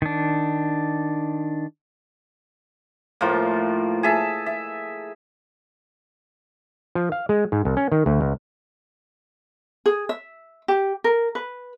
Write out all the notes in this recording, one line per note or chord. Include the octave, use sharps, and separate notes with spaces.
D#3 D4
A2 F3 A#3 F4
G#4 E5 A5
E5
F3
F5
G#3
G#2
C2
C#4
D#3
D2
C#2
G#4
E5
G4
A#4
B4